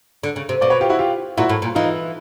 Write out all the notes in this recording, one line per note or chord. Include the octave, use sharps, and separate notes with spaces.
D3
C#3
C3
B2 C5 D5
B4 C#5
F4 G4
E4 F#4
F4 G4
A#2 E4 F#4
A2
A#2
E3 D#4 F4